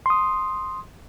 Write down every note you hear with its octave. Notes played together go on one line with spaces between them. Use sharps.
C6 D#6